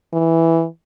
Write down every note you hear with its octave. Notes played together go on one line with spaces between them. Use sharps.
E3